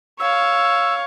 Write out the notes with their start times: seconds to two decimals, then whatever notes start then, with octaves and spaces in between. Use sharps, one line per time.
0.20 C#5 F5 E6